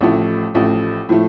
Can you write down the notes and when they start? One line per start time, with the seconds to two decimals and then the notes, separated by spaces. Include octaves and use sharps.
0.01 A1 A2 F3 A3
0.54 A1 A2 F3 A3
1.09 A2 F3 A3